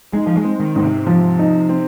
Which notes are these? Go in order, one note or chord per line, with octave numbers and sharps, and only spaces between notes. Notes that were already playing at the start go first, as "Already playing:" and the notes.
G#3 D#4
F3
G#3
C4
D#3
G#2 D#3
C3
F3
D#4
C4